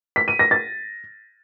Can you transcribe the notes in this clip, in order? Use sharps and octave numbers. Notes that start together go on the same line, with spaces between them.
B6
D#7
A#6
A6